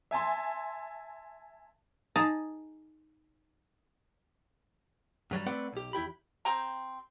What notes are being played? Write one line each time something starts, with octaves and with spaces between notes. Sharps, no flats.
E5 G#5 A5 C6
D#4 G#4 A5 A#5
G2 F#3 G3
A3 C4 B4 D5 F#5
B1 G4
E2 E4 G4 B5
C4 G4 A#5